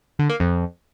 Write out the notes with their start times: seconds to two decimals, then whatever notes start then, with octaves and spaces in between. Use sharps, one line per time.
0.19 D3
0.30 A#3
0.40 F2